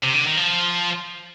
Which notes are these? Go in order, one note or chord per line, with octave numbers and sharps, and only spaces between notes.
C3
D3
D#3
F3